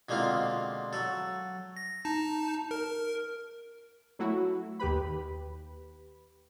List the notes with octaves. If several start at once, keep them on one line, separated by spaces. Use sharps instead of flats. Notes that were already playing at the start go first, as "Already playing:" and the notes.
B2 D3 G#3 A#3 C4 F4
F#3 A4
A#6
D#4 A5
A#4
F#3 A3 E4 F#4
D#2 G4 B4 B5